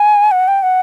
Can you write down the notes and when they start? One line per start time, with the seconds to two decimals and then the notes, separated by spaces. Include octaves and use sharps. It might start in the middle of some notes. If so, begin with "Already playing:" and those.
Already playing: G#5
0.31 F#5
0.48 G5
0.63 F#5